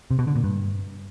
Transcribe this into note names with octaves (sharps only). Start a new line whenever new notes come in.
C3
B2
D3
A#2
G2